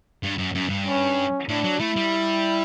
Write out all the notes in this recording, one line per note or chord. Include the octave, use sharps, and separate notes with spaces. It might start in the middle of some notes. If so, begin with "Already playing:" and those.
G2
F#2
F#2
G2
C#4
A2 D4
F#3
A3 E4
G3